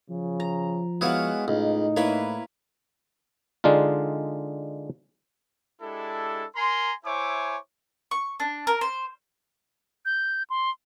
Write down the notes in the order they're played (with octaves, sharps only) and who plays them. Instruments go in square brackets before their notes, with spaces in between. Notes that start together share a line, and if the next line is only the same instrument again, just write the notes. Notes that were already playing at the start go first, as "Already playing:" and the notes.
[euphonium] C#3 [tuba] F3
[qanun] A#5
[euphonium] G#3 [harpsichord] B3 E4 F#4 [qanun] C#5 F5 F#5
[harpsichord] C#2 [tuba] A2 [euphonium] D#4
[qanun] A#3 E4 B4 [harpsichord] C#5 D5
[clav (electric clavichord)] D3 G#3 D4 D#4 F4
[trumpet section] G#3 D4 E4 G4 A4
A#4 G#5 A#5 C6
E4 C5 C#5 E5 G#5 D6
[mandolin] C#6
D4
A#4
C5
[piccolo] G6
C6